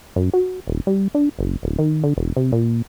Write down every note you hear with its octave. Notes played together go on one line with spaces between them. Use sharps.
F#2
F#4
D#1
G3
D4
F#1
D1
D#3
D3
E1
C3
A#2